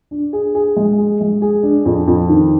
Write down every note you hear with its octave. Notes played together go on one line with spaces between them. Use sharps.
D4
G#4
G#4
G#3
G#4
G#3
G#4
D4
F2
F2
D#3